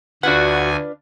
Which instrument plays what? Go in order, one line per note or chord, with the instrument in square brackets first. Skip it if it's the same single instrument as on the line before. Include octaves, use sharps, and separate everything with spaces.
[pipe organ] D2 G#5 [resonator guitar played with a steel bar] D4 F4 B4 [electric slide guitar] F#4 F#5